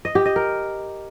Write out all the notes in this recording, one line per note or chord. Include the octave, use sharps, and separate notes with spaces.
D#5
G4
D#5
A#4